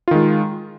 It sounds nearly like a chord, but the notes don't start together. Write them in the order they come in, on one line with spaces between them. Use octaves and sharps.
F4 D#3 G#3